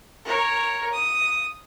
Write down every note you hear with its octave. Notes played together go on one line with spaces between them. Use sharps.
A#4 C#5
D#6